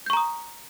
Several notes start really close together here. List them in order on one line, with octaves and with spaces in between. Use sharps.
G6 C#6 A#5 D#6